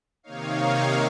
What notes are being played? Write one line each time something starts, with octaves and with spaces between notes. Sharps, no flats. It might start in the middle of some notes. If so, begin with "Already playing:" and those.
C3 D#3 A#3 D#4 C#5 F5